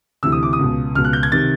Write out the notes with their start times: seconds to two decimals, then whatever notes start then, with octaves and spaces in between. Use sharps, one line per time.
0.23 D2 C3 E3 E6
0.32 D#6
0.43 D6
0.53 D#6
0.59 C#2 B2
0.95 C#2 B2 F6
1.04 F#6
1.13 G6
1.23 G#6
1.32 C3 D#3 A6